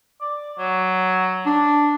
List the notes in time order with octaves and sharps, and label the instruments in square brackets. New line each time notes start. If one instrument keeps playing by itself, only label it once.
[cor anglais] D5
F#3
[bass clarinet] D4